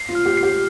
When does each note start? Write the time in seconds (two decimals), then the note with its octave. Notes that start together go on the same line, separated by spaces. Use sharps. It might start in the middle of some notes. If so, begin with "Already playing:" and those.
Already playing: C7
0.09 F4
0.15 F6
0.26 G4
0.37 C7
0.43 G4